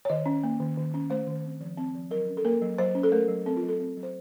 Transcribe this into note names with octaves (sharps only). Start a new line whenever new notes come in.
C#5
D#3 D#5
C#4
A#3
D#3
D#3
C#4
A3 C5
D#3
C4
F3
C4
F3
F#3 A#4
C#4
A4
A#3 A#4
F#3
F#3 C5
C#4
A4
A3 A#4
F#3
C4 A4
F4
F#3
A4
C4
F#3
C5